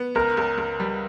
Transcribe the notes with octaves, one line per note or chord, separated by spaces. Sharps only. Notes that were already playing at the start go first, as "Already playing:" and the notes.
Already playing: B3
C#2 A#4
C#2
C#2
G3